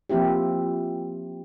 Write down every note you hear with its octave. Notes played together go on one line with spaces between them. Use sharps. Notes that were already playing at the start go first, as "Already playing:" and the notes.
F3 A#3 C4 E4 G4